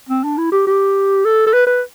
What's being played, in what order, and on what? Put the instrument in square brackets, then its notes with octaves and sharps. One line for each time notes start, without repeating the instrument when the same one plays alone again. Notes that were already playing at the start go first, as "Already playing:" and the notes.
[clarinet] C4
D4
E4
G4
G4
A4
A4
B4
B4